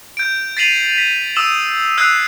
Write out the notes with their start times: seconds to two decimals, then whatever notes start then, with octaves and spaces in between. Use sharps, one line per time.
0.17 G6 D7
0.57 A6 B6 C7 D#7 F7 F#7
0.98 B6
1.36 D#6 E6 E7 F#7
1.98 E6 F#6 G#6 C7 F7